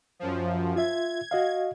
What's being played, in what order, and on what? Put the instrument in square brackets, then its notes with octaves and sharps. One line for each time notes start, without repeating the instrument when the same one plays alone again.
[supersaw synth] F#2 F3
[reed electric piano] F4 E5 [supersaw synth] G#6
[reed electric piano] F#4 D#5 F5